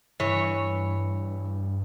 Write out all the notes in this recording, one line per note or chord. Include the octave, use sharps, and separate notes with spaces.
G2 E3 C#5